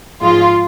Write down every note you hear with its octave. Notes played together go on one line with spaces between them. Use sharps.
G#2 F3 G#3 F4